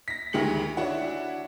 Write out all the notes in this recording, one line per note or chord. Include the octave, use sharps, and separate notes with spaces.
A#6 B6
D2 D#3 G#3 G4 C#7 F#7
D4 E4 F#4 C#5 F#5